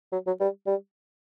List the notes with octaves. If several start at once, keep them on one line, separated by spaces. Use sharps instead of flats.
F#3
F#3
G3
G3